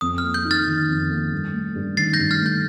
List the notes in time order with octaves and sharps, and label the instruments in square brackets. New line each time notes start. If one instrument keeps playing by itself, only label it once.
[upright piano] F2 [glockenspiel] D#6
[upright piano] A#3 [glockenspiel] F6
[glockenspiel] G6
[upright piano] D#4
[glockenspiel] F6 A6
[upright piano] D#3
F2
A#3
G2
A3
G2
[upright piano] D#3 [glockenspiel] A6 C7
[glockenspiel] G6 A#6
[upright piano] G2
[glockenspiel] F6 A6
[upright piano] A3
[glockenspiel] G6